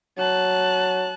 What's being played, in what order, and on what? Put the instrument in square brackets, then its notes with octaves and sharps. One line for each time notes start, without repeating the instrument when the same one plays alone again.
[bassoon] F#3 [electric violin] A5 F#6